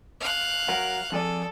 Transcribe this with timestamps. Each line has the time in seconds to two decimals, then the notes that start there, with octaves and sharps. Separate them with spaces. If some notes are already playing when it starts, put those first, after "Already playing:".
0.20 F5 F#6
0.68 F#3 A#4 F#5
1.12 F2 G#4 A4 D5